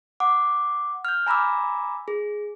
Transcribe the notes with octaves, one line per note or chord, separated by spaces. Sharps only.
F#5 D6
F6 G6
G#5 A#5 B5 D6 E6
G#4